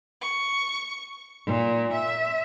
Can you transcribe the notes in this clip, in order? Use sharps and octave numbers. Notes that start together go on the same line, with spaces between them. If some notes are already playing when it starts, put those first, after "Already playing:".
C#6
A#2
E5